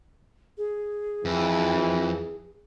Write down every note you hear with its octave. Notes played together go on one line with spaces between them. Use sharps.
G#4
F2 E3